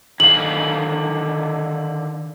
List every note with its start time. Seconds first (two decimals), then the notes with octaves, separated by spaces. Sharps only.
0.20 D3 D#3 F5 F#7